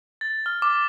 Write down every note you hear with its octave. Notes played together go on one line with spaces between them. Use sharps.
A6
F6
D6